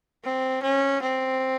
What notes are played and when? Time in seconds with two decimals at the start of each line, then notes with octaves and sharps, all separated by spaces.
0.24 C4
0.63 C#4
1.02 C4